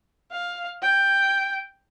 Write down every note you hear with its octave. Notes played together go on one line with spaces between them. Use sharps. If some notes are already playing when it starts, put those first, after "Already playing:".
F5
G5